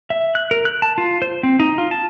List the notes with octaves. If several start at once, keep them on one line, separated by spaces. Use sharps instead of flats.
E5
F#6
A#4
F#6
A5
F4
C5
C4
D#4
F4
A5